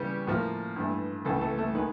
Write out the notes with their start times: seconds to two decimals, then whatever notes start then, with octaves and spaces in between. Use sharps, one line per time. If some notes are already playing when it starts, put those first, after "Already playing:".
Already playing: C#3 E3 G3 B3 G4
0.27 A2 F3 A#3
0.76 G2 E3 A3
1.25 C#2 C#3 E3 A3 A4
1.41 A3 A4
1.58 A3 A4
1.74 D#3 G#3 B3 D#4 B4